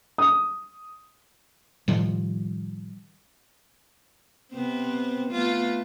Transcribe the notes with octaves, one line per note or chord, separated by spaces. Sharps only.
D#6
A2 D#3 F3 G3
C3 B3 C4
A3 B3 F4